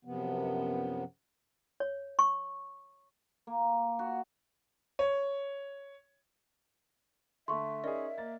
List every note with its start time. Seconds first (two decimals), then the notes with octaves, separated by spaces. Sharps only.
0.05 F#2 C3 F3 B3
1.80 C#5
2.19 C#6
3.47 A#3
3.99 F#4
4.99 C#5
7.48 D3 A3 E5 C6 C#6
7.84 C#4 D#4 G#4 A#4 D5 D#5
8.18 A#3 A6